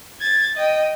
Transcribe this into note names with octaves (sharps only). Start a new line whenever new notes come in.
G#6 A6
D#5 G5